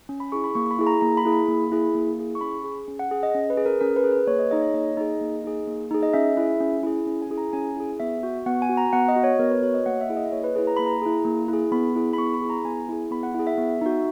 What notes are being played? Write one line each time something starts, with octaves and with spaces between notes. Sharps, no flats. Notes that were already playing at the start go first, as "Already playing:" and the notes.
C#4
B5
E4 G#4 C#6
B5
A#3 C#6
B5
E4 G#4
A#5
A#3 A#5
B5
E4 G#4
B5
A#3
E4 G#4
A#3
E4 G#4
C#6
C#4 B5
G#4
C#4
F#5
G#4
D#5
C#4
B4
G#4
A#4
C#4 A#4
B4
G#4
B4
A#3 C#5
D#5
D#4 G#4 D#5
C#5
A#3 D#5
D#4 G#4
A#3
D#4 G#4
A#3
D#4 G#4
D#5
C#4 E5
E4 G#4
C#4
E4 G#4
C#4
G#5
E4 G#4
A#5
C#4 G#5
E4 G#4
B3 E5
F#4
B3 F#5
G#5
F#4
A#5
B3 F#5
D#5
F#4
C#5
B3 A#4
B4
F#4 C#5
D#5
A#3 F#5
E5
E4 G#4
D#5
A#3 C#5
B4
E4 G#4 B4
A#5
A#3 B5
A#5
E4 G#4
A#3
E4 G#4
B3 B5
E4 G#4
B5
B3 C#6
B5
E4 G#4
A#5
B3 G#5
E4 G#4
B3 B5
F#5
E4 G#4 F#5
E5
B3
D#4 F#4